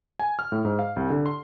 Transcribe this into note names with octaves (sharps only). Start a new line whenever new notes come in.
G#5
F6
A2
G#2
F5
C2
D3
C6